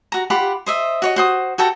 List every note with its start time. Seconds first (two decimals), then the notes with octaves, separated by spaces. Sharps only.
0.12 F#4 A#5
0.30 F4 G4 F#5 B5
0.66 C5 D#5 E5
1.02 F#4 C#5 D#5
1.16 F#4 C5 D#6
1.58 F#4 A4 G5 A#5